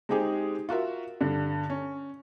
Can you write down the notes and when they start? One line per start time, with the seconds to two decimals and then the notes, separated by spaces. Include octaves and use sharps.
0.09 G#3 C4 D#4 G4 G#4
0.69 F4 F#4 A#4 E5
1.21 G2 D3
1.70 C#4